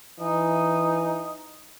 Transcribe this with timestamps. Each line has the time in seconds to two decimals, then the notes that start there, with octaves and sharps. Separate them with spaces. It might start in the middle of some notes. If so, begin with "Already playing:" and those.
0.20 E3 D#4